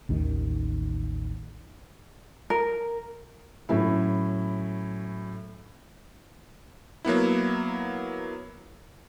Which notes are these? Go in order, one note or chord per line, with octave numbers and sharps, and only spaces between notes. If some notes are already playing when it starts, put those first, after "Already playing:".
A1 D#2 D#3
A#4
A2 F#3 C#4 E4
F#3 A#3 B3 E4